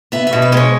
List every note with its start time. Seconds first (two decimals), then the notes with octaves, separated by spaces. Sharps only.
0.12 B3 E5
0.27 E5
0.33 B2
0.42 B4
0.52 G#3 B4
0.57 C#5